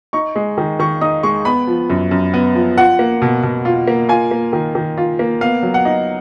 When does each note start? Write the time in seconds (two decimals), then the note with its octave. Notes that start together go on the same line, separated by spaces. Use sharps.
0.13 D#4 C#6
0.36 G#3
0.58 D#3
0.80 D#3 C#6
1.01 D#4 D#6
1.23 G#3 C#6
1.45 B3 B5
1.67 F3
1.90 F#2
2.11 F#2
2.34 B3
2.55 F3
2.78 F4 F#5
2.99 A#3
3.22 B2
3.43 B2
3.65 F4
3.88 A#3
4.09 F4 G#5
4.31 A#3
4.53 D#3
4.75 D#3
4.98 F4
5.19 A#3
5.41 B3 F5
5.63 F#3
5.74 F#5
5.85 D#4